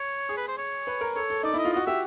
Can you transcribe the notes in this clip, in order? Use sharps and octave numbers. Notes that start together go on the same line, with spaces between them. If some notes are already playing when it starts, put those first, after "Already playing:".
Already playing: C#5
G#4
B4
C5
C#5
B4
A#4
A4 C#5
A4
D#4 D5
E4 D#5
F4
F#4 D#5
G4 E5